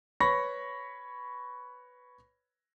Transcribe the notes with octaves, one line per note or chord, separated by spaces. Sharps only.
B4 C#5 B5 C#6 A#6